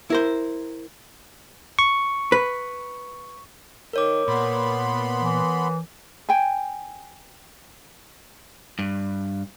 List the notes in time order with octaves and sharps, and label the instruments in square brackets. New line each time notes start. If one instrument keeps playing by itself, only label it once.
[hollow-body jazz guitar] E4 A#4 C5
[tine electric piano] C#6
[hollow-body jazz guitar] B4
[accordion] D#3 [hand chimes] A#4 C#5 D6
[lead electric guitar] A#2 [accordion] B3 B5 C6
[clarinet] E3
[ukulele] G5 G#5
[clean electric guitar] G2